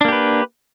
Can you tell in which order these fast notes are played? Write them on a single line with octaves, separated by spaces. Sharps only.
D4 A#3 G4 B4